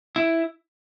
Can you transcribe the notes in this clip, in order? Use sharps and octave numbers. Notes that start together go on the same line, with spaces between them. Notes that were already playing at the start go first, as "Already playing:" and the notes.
E4